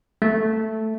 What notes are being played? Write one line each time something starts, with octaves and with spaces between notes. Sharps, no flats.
A3